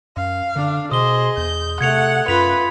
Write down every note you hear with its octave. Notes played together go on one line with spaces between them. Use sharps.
F#2 F5
D3 D4
B2 G#4 C5 D#5 D#6 G7
E2 G6
C3 A3 F#5 G#6 C#7 F7
F#2 F4 B4 B5 B6 F7